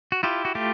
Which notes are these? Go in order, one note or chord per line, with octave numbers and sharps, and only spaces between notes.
F#4
E4 F4 G4
F#4
A3 F4 G4